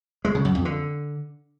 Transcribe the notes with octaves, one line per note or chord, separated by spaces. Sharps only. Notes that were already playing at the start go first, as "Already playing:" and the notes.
G#3
C#3
F#2
F2
D3